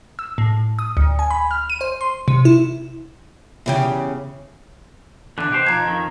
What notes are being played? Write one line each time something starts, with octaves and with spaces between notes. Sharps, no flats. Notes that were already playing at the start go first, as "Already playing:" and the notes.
E6
A2
D#6
D2
G#5
B5
F6
D#7
C5
C6
C3
E4
E2 C#3 G4
E2 D3 D6 F#6
B2 G4 C5
F3 D#4 A#5 G#6
F2 D#3